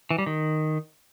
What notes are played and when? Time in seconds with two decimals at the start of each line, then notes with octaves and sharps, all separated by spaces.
0.11 E3
0.18 G3
0.26 D#3